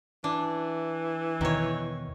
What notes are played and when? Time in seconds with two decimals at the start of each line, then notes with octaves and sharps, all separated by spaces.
0.24 E3 D4
1.41 E2 B2 D#3 C#5